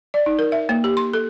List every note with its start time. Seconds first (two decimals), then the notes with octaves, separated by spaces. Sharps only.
0.14 D5
0.26 D#4
0.39 A#4
0.52 E5
0.69 A#3
0.84 G4
0.97 C6
1.13 A4